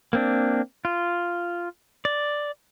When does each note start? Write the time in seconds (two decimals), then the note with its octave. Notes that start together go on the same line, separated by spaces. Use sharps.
0.13 A#3 C4 D4
0.85 F4
2.05 D5